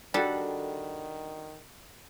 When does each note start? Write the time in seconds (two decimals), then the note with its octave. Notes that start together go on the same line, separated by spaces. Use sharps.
0.14 D#3 G3 D4 F#4 A4